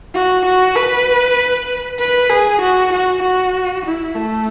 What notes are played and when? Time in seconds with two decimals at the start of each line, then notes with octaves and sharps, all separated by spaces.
0.14 F#4
0.45 F#4
0.76 B4
1.99 B4
2.30 G#4
2.61 F#4
2.92 F#4
3.22 F#4
3.85 E4
4.15 A3